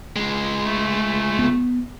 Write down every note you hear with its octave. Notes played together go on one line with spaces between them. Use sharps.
C#2 G#3
A3
B3